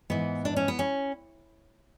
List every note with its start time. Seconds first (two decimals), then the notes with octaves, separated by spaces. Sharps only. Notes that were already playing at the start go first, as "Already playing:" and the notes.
0.10 G#2 E3 B3
0.45 D4
0.57 C#4
0.68 B3
0.79 C#4